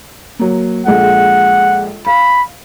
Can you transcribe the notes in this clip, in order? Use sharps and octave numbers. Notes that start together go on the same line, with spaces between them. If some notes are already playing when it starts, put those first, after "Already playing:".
F#3 A#3
A#1 G#3 A4 F#5
F5 B5